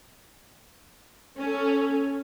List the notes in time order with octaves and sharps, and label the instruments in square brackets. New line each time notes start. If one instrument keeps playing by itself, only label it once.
[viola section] C#4 A4